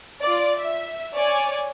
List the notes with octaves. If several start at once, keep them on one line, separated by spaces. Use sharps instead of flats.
F4 D5
E5
C#5 D5 G#5